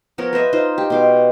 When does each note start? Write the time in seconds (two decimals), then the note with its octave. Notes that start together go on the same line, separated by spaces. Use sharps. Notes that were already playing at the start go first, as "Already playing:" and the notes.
0.18 F3 B3 A#4 C#5
0.33 B4 C5 D#5 E5
0.53 D#4 F4 C5
0.78 G4
0.90 B2 C6 D6